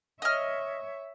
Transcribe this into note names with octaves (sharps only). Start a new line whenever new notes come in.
C#5 D#5 E5 F6